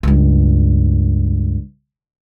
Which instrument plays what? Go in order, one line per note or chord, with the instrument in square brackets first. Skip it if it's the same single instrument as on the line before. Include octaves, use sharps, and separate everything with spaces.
[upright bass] C#2 G2